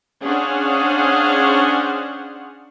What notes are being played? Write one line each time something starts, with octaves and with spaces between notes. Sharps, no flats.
C#4 D4 G#4 C5 F5 F#5